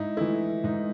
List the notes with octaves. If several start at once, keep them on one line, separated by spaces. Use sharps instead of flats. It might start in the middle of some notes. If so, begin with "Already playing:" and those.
Already playing: G#2 D#4 E4
E3 A3 E4
G#2 D#4